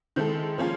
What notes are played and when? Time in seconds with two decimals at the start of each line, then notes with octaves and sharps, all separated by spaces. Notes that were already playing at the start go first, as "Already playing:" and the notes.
0.16 D#3 G#3 C4 E4 A4
0.58 F3 A#3 C#4 F4 G#4